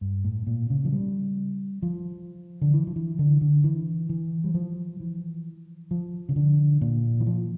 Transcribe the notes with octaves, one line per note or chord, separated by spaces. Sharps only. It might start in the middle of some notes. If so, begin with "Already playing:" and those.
G2
A2
A#2
C#3
F3
G3
F3
D3
E3
F3
E3
D3
D3
E3
E3
G3
F3
E3
F3
C#3
D3
A#2
E3
F3